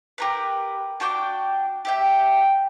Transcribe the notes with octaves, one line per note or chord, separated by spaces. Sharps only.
G4 A#4 B4
D4 F#4 G5 D6
G4 E5 G5